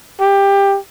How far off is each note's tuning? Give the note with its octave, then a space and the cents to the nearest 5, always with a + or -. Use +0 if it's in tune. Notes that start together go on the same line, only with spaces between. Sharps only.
G4 +15